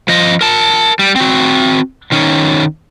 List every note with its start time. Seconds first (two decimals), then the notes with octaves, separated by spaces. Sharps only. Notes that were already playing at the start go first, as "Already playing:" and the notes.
0.08 F3 D#5
0.41 A#4 A5
0.99 G3
1.16 C4 F#4
2.12 D#3 C#4